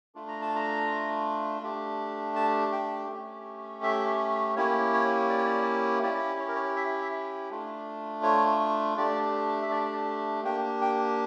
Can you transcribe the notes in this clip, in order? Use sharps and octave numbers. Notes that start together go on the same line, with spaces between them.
A3 D4 F4
A#5
A5
A#5
A3 D4 G4
A5
G5
A3 C#4 G4
E5
A#3 C#4 E4 G4 C#5
C#5
D5
C#5
D5
C#4 E4 G4 D5
C#5
A#4
C#5
E5
E5
A3 D4 F4
C#5
A3 D4 G4 D5
E5
D5
A#3 D4 G4 G5
G5